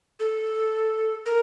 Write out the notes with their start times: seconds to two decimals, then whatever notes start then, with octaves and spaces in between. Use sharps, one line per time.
0.20 A4
1.26 A#4